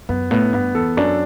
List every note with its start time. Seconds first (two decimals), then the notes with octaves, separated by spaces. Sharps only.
0.09 F#2 B3
0.31 A2 B3
0.53 G2 B3
0.75 E2 A4
0.97 F#2 D4